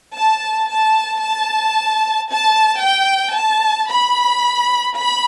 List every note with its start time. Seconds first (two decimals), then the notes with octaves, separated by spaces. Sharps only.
0.15 A5
0.69 A5
1.22 A5
2.28 A5
2.82 G5
3.36 A5
3.89 B5
4.96 B5